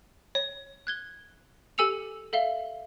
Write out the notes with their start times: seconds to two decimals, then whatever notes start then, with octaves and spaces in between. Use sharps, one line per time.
0.35 C#5
0.87 F#6 G#6 G7
1.78 G4 A4 G#5 E6 C#7 F7
2.33 A4 E5 F5 G7